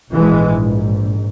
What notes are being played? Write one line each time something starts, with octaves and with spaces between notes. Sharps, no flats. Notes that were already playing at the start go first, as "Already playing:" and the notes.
A#1 G#2 E3 G#3